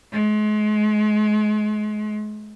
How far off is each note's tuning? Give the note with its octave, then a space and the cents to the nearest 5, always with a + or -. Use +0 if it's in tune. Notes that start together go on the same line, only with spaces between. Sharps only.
G#3 +35